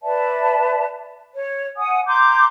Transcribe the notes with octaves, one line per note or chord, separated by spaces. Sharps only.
B4 D5 E5 A5
C#5
F#5 G#5 D#6
A#5 C6 D6 G6